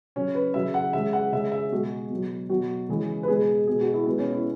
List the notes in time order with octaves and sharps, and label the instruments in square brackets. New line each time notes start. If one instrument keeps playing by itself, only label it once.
[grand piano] C#3 F#3 C#4
B4
C#3 F#3 E5
F#5
C#3 G#3 E5
F#5
C#3 G#3 E5
E5
B2 G#3 F#4
B2 F#3
B2 F#3 F#4
C#3 E3 G#3
B4
B2 G#3 G#4
B2 G#3 G#4
F#4
E4
B2 G#3 B3
C#4
E4